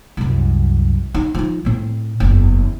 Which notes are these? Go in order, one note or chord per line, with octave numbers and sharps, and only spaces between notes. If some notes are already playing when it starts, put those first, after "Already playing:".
C2 F#2
D#4
F3 D#4
A2 C4
F#1 E2